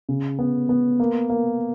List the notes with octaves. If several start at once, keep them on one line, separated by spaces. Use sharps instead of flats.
C#3
B3
B3
A#3
A#3